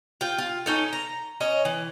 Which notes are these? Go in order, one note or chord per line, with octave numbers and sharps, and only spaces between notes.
F4 G5
F4
C#4 D#4 A4
A#5
C#4 C#5 D#5
E3